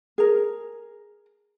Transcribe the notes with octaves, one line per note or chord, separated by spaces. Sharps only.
G#4 A#4